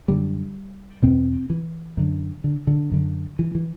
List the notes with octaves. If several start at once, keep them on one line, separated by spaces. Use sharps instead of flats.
F#2 D3 G3
E2 B2 C4
E3
F#2 D3
D3
D3
F#2 D3
E3
E3